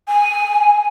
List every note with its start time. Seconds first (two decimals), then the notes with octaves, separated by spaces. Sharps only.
0.08 G#5